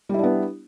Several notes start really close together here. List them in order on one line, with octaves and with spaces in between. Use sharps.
G3 E4 D4 B3